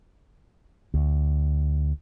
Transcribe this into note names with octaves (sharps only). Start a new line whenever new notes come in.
D2